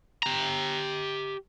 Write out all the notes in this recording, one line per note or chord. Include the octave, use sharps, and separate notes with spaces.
G4 A#5